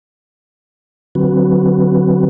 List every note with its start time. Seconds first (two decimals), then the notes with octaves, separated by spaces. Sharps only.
1.15 D3 F#3 C4 F#4 B4